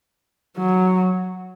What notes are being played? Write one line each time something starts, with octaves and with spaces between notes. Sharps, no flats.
F#3